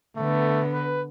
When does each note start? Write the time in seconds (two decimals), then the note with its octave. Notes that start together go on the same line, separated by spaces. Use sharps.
0.17 D3 A3 B3
0.74 B4